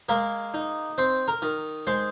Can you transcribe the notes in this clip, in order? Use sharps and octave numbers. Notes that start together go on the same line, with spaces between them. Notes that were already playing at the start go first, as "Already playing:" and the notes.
G#3 A#3 A#4
D#4
C4 C5
A#4 A#5
D#3
G#3 C5 C6